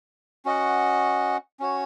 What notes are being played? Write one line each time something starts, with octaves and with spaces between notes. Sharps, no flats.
C#4 F#4 D#5 F#5
C#4 F#4 C#5